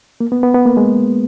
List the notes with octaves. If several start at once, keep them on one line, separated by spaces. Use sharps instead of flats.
A#3
B3
B3
B3
A#3
G#3